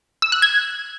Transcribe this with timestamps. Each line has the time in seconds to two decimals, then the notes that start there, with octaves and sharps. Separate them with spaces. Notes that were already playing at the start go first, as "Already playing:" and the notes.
0.22 E6
0.32 F#6
0.42 G#6